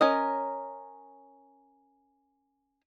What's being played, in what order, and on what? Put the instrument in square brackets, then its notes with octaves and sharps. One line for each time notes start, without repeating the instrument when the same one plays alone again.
[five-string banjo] C#4 A#4 D#5